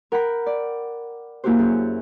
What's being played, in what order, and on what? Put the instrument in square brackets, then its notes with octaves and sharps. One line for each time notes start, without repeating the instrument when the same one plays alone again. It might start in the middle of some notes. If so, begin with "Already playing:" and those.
[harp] A#4 F#5 G5 A#5 B5
D5
A#3 E4 F#4 G4 C5
F#2 F#3 G#4